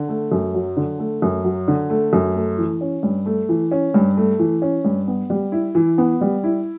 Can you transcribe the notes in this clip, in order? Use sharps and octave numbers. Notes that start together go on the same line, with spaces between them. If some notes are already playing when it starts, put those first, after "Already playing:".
Already playing: D3
A3
F#2
F#3
D3
A3
F#2
F#3
D3
A3
F#2
A3
E3
C#4
G2
A3
E3
C#4
G2
A3
E3
C#4
G2
B3
G3
E4
E3
B3
G3
E4